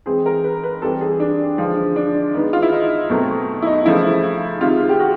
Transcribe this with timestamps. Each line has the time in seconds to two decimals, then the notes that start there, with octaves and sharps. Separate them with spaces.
0.06 E3 G#3 C4 G#4
0.26 A#4
0.44 B4
0.63 B4
0.82 E3 G3 C4 A4
1.01 G#4
1.20 D4
1.58 D3 F3 G#3
1.96 D4
2.34 D#3 G#3 B3
2.53 F4
2.62 E4
2.72 D#4
3.10 B2 F#3 A3 C4
3.62 E4
3.66 D#4
3.86 C#3 F3 A3 E4
4.61 C3 D#3 G#3 F4
4.89 G4
5.00 F#4